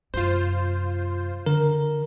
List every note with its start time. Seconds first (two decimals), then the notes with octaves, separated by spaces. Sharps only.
0.14 F#2 C3 F4 C5
1.46 D3 A#4